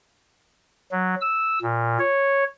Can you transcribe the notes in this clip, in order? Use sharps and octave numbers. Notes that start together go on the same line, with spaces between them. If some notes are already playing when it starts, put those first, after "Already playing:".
F#3
E6
A#2
C#5